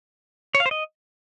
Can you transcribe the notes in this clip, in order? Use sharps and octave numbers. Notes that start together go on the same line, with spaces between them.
C#5
F5
C5
D#5